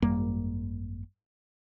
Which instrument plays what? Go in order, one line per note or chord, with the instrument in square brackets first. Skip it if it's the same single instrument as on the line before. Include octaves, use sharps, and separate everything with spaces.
[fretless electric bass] G#1 F#2 G3 A#3